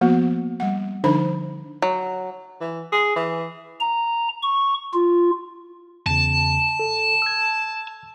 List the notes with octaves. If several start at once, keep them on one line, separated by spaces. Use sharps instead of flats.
F3 A#3 B3 F#4
G3 F#5
D3 F3 D4 D#4 C5 B5
F#3
E3
G#4
E3
A#5
C#6
F4
E2 C#3 A5
A4
E6 G#6